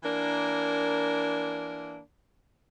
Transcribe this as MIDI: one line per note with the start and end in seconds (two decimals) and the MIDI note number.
0.03 2.00 52
0.03 2.00 58
0.03 2.00 62
0.03 2.00 70